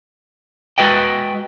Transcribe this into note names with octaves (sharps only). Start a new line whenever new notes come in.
G#3 F#4 B4 D#5 G5